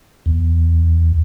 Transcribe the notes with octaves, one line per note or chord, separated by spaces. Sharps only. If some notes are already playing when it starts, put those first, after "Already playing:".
E2